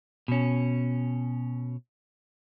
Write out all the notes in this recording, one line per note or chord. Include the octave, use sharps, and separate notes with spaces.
B2 C#4